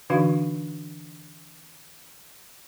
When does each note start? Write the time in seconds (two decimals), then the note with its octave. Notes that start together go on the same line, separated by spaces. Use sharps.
0.10 D3 E3 D4 D#4 F#4 F5